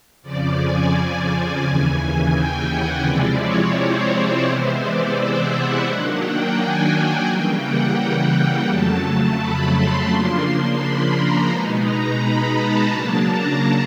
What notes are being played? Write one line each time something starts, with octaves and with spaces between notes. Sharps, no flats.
F2 C#3 F3 D5
G#5
D#2 C#3 E3 G#5
G5
F#5
C3 F3 G#3 C4 E4 D5
C#5
C5
C3 E3 G#3 B3 E4 C5
D5
E5
F#5
D#3 F#3 A#3 D4
G5
G#5
C#3 E3 G3 A#3 G5
F#5
G5
F2 C#3 F#3 A3 A5
B5
C6
C#3 F3 A#3 D4 C6
B5
A#5
B2 G#3 B3 D#4
A#5
B5
A5
C#3 F#3 A#3 D4
A#5